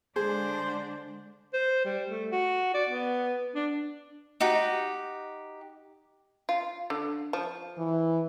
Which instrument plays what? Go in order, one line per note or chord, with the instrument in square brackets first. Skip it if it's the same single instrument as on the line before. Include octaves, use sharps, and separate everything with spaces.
[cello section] D3 G#3 D4 [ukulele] G#4 [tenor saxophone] C5
[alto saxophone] C5
G3
A3
F#4
D5
B3
D4
[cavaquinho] D#4 F#4 G4
[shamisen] F4
D3
F3
[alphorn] E3